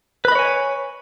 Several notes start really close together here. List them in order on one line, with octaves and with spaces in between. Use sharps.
B4 B5 D#5 C#5 G#5